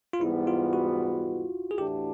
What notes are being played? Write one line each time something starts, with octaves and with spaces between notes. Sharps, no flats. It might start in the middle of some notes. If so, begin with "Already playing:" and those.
F4
G#2 E3 G3 B3 E4
F4
F#4
G#4
A2 E3 A3 D4 F#4 G4